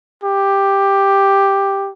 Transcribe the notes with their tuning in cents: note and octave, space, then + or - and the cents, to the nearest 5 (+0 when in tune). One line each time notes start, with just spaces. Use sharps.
G4 +5